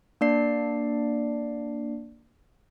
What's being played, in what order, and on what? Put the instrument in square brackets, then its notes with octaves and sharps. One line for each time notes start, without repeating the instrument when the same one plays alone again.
[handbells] A#3 D4 D5 C7